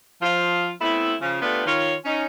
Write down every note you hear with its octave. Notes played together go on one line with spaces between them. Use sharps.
F3 F4
A3 B3 C4 E4
C#3 F3
A3 B3 D4 F4 G4 B4
D#3 F4 C#5
C#4 D#4